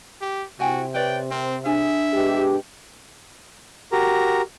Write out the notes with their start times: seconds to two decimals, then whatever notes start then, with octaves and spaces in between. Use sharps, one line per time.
0.21 G4
0.60 C3 E4 F#4 G5 G#5
0.94 B4 C#5 D5 G5
1.31 C4 A#4
1.65 D4 G#4 E5 G#5
2.13 B2 G#3 G4
3.92 F#4 G4 A#4 A#5